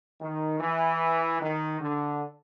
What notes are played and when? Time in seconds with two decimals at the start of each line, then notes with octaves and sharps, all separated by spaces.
0.21 D#3
0.60 E3
1.40 D#3
1.80 D3